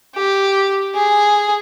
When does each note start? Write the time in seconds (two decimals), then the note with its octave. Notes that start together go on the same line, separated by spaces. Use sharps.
0.15 G4
0.95 G#4